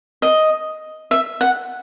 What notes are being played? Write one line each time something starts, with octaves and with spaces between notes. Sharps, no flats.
D#5
E5
F#5